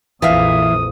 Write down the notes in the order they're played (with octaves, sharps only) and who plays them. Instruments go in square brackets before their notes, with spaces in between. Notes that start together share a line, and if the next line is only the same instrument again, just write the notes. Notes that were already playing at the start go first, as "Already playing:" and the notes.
[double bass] A#1 F2 [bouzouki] A#2 E5 F5 [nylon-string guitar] E3 [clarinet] D#6